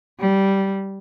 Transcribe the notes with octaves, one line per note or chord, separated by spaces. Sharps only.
G3